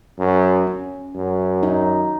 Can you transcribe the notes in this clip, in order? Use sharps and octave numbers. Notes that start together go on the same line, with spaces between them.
F#2
C#4
F#2
D#4